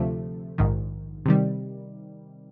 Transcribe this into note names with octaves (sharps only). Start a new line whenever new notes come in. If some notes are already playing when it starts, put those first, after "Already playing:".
Already playing: D2 C3 F3 A3
A#1 G#2 D#3
C3 D#3 G3